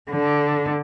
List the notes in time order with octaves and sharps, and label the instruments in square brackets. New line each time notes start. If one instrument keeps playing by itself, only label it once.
[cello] D3